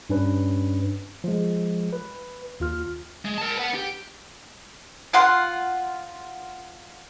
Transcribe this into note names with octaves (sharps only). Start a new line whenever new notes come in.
G2 C#4 D4 B4
F3 G#3
B4
D#2 F4 F6
G#3
A#4 A5
B4 F#5
G4
F4 F#5 C6